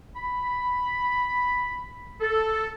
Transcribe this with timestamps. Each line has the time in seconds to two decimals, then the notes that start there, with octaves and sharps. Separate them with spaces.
0.16 B5
2.21 A4